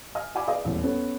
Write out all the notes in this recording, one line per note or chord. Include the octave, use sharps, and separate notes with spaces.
D#5 G#5 F6
D5 E5 G5 G#5 B5 D6
G#4 B4 D5 D#5 F5
D#1 A1 E2 E3 E4
B3 C#4 A4